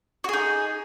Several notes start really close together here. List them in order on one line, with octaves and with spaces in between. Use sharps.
F#4 G#4 D#4